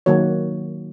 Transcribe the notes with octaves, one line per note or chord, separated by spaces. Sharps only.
D#3 F#3 A#3 F#4 C#5